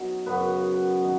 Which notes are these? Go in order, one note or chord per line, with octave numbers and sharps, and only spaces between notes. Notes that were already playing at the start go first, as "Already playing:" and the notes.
Already playing: B2 F#3 C#4 D#4
F#2 C#3 B3 B4
D#3 B3 D#4